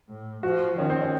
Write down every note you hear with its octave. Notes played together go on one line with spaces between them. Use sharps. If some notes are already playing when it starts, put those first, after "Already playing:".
A2
F3 F#4
D#3 C#4
C4
C#4